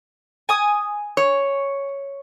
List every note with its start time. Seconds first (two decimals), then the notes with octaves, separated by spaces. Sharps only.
0.49 G#5 D#6
1.17 C#5